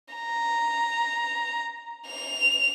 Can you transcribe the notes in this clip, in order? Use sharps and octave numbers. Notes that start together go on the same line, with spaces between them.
A#5
F7